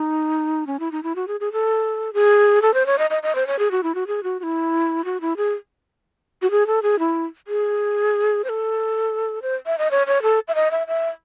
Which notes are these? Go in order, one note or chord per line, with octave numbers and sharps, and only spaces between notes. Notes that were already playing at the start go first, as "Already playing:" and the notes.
Already playing: D#4
C#4
E4
D#4
E4
F#4
G#4
G#4
A4
G#4
A4
C5
C#5
D#5
D#5
D#5
C5
C#5
G#4
F#4
E4
F#4
G#4
F#4
F#4
E4
F#4
E4
G#4
F#4
G#4
A4
G#4
E4
G#4
C5
A4
C5
E5
D#5
C#5
C#5
A4
E5
D#5
E5
E5